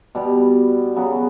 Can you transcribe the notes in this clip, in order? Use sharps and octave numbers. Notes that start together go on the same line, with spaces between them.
B2 G3 B3
C#3 F#3 B3